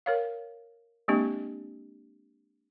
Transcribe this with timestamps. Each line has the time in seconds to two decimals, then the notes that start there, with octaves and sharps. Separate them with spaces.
0.06 A#4 C#5 F5
1.08 G#3 A#3 C4 D4 G4